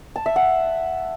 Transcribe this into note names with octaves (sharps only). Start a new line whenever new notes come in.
A5
E5
F#5